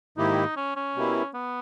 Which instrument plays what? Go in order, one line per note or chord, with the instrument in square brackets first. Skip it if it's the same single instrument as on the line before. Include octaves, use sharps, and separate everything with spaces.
[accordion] G#2 D#3 A#3 E4 G4 [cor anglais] D#4
[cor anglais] C#4
C#4
[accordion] B2 G3 A#3 E4
[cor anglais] B3